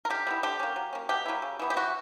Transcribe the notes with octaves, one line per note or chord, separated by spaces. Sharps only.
A#4
D3 G4
G3 B3 E4
D3 G4
A#3 C#4
F#3
A#3 C#4
B2 G4
F#3 A#3 E4
C#3
E3 B3 E4
G4
E3 F#4